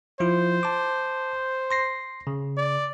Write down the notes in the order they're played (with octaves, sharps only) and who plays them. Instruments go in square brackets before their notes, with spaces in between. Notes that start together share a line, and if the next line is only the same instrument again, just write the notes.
[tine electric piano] F3 E4 F4 [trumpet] C5
[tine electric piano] A5 D6
C6 A#6 C7
C#3
[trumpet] D5